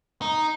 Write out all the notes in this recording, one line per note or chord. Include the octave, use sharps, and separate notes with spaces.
D#4